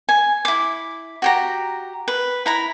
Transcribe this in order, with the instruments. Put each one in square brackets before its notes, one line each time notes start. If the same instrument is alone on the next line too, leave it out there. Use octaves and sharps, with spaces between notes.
[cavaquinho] G#5
E4 D6
F#4 G4 A#5
B4
E4 A#5 B5